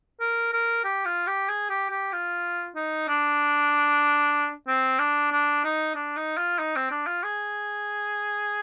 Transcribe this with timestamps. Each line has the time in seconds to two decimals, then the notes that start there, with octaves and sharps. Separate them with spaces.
0.20 A#4
0.53 A#4
0.84 G4
1.05 F4
1.27 G4
1.49 G#4
1.70 G4
1.91 G4
2.12 F4
2.76 D#4
3.09 D4
4.68 C4
4.99 D4
5.32 D4
5.64 D#4
5.95 D4
6.17 D#4
6.38 F4
6.59 D#4
6.76 C4
6.91 D4
7.07 F4
7.23 G#4